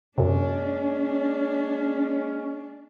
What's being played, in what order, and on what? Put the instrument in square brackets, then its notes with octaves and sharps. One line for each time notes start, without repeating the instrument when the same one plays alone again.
[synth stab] F#2 C3 [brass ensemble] G#3 A#3 C#4 [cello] D4